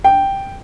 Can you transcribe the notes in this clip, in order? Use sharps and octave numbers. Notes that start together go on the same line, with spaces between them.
G5